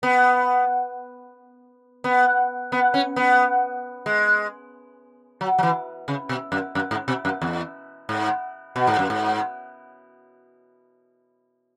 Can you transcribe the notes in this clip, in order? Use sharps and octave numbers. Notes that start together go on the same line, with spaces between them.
B3
B3
B3
C#4
B3
G#3
F#3
F#3
E3
C#3
B2
F#2
F#2
G#2
B2
F#2
E2
G#2
B2
G#2
F#2
G#2